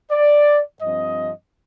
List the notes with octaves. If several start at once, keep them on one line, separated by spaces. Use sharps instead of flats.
D5
G2 F3 C4 D#5